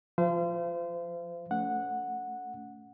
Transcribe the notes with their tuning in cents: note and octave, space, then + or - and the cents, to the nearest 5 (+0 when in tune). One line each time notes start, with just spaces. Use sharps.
F3 +0 C5 -35 F5 -40
A3 +0 C#4 +30 F#5 -10